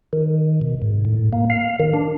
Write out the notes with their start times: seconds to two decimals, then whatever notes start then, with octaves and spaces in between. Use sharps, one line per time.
0.13 D#3
0.61 B2
0.82 G#2
1.05 A2
1.33 A#3
1.50 F5
1.80 D#3
1.94 D4